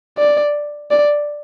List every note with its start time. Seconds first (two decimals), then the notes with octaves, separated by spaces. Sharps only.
0.18 D5
0.91 D5